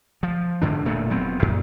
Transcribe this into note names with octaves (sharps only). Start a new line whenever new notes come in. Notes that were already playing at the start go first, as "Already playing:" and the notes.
F3
G#2 D3 D4
E1 A#2 A3
F1 F#3 B3 C4
F#2 A#2